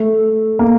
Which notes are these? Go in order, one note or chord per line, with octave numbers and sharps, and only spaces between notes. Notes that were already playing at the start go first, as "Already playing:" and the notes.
Already playing: A3
A#3